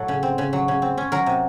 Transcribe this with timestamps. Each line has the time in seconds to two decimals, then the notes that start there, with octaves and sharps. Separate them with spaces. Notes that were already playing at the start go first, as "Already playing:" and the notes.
Already playing: A2 F#3 A4
0.08 C#3
0.23 C4
0.38 C#3
0.53 F#3
0.68 C#3
0.82 C4
0.98 C#4
1.12 F#3 A#4
1.26 C3